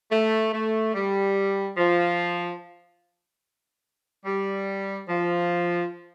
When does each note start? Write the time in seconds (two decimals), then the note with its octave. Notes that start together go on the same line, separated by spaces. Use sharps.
0.12 A3
0.53 A3
0.94 G3
1.77 F3
4.25 G3
5.09 F3